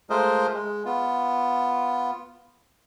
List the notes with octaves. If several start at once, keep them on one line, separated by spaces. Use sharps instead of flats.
G#3 A3 F4 A#4 C5 D#5
G#3
B3 F4